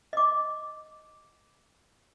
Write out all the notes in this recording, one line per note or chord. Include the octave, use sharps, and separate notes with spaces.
D#5 D6